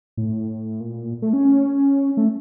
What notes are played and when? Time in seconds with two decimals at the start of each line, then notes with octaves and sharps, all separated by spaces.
0.17 A2
0.80 A#2
1.22 A3
1.33 C#4
2.17 A3